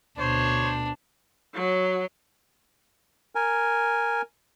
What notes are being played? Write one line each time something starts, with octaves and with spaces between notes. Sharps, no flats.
D2 B2 D4 C5 C#5
F#3
A#4 G#5